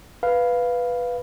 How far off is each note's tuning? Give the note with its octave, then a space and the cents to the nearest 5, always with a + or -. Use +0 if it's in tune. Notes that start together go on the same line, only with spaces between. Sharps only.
B4 +0 F5 +0